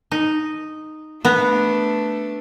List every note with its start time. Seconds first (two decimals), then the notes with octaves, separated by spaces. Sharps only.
0.12 D#4
1.25 A3 B3 D4 A#5